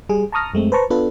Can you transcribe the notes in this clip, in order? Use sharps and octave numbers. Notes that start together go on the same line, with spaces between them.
G3 G#4
A5 A#5 C#6 D#6 F6 A#6
F#2 G#3 A3 C4
B4 C5 A5 A#5 C#6
B3 D4 F4 A4 B4